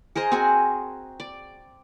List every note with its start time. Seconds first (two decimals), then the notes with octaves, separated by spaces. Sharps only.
0.16 G#4 A#4 C5 D#5
0.32 C4 F#4 G#4 G#5
1.20 D5